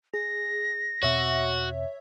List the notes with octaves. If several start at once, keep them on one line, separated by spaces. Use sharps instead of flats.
G#4 A#6
E2 B2 C4 F#4 C#5 E5